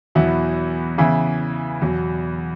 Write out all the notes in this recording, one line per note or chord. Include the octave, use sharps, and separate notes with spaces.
E2 B2 F#3 B3 E4
C#3 E3 B3 E4
E2 B2 F#3